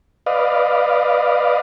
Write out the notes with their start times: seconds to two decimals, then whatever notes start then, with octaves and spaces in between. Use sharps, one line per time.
0.26 B4 D5 D#5 F5